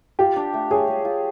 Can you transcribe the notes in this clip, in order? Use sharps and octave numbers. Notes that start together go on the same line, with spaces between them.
F4 G4
D4
A3
G#4 C#5
G#4
F4